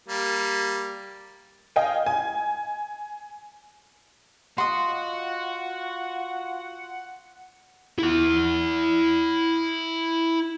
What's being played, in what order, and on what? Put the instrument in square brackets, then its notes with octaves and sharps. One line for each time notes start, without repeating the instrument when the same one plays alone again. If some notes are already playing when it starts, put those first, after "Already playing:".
[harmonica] G3 A#3
[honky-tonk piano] D#5 F5 G5 G#5
G#5
[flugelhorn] F4 [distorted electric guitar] F#4 [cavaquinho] D#5 C6 [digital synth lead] F#5
[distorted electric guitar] E4 F#5